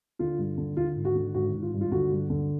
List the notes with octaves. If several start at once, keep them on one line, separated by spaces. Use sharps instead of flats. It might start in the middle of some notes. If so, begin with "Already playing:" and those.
D3 F4
G2
D3
D3 F4
G#1
F#4
D3
G#1 F#4
G#1
F4
G2
F4
D3 F#4
G2
D3